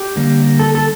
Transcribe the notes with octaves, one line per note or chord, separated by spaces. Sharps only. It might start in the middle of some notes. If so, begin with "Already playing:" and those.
Already playing: G4
D3 G3 A#3
A4
A4